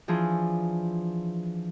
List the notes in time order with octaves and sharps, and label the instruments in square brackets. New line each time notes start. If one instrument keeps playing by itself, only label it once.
[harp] E3 F3 D4 G#4